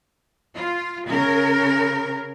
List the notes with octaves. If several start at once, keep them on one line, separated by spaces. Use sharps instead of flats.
F4
C#3 A#4